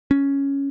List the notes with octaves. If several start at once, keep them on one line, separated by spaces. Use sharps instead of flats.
C#4